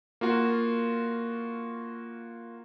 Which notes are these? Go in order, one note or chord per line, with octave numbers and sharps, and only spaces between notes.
A#3 F4 F#4